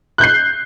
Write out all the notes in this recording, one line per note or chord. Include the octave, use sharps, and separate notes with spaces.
F#6 G6 C7